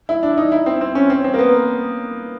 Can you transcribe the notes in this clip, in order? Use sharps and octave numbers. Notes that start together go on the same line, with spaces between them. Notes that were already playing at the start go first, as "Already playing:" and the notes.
E4
D4
D#4
E4
C4
C4
C#4
C4
C4
A#3
B3